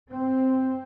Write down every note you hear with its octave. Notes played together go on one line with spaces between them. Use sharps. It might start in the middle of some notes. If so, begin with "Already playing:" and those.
C4